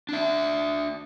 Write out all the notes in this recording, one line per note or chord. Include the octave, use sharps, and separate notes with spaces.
D4 E5